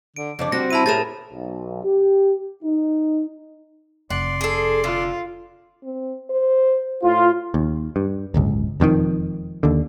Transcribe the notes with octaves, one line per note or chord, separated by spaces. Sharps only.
D3 D7
F2 C#3 D4 D5
G3 C4 F#4 A#6
E4 A5 B5 D#7
A2 G4 G#4 A#4 A6 E7
B1
G4
D#4
F1 D5 F#5 C6
G#4 A4
D3 F4
C4
C5
A2 F4
D#2
G2
D1 G1 C#2
E1 F2 G#2 D#3
D#2 D3